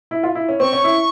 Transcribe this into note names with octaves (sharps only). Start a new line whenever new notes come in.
E4
F4
E4
C#4
C4 C#6
C#4
E4